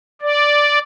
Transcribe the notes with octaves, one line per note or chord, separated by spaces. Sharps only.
D5